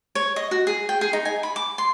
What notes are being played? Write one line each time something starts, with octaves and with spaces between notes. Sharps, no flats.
C#5
D#5
F#4
G#4
G5
G#4
D#4
G#5
B5
D6
C6